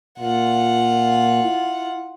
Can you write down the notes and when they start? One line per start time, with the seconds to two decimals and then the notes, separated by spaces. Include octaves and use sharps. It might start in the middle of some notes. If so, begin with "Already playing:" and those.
0.19 A#2 F4 F#5
1.44 E4